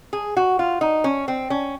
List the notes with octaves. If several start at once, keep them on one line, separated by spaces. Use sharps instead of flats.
G#4
F#4
F4
D#4
C#4
C4
C#4